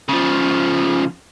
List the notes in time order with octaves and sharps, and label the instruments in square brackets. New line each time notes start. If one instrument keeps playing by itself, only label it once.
[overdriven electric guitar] C#3 F3